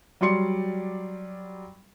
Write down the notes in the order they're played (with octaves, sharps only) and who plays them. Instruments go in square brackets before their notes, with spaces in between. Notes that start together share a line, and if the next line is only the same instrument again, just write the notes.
[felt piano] F#3 G3 D5 C6 C#7